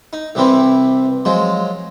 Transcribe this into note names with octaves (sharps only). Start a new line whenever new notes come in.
D#4
C2 C3 E3 C4 E4
F3 F#3 G#3